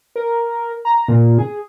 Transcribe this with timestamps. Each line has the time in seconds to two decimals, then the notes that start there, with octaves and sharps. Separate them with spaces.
0.16 A#4
0.85 A#5
1.08 A#2
1.39 G#4